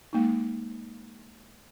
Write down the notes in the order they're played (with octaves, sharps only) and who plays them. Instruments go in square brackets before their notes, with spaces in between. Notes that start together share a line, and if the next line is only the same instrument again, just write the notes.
[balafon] G#3 A#3 D#4